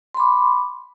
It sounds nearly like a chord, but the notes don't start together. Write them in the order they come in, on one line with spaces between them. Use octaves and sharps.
C6 B5 D6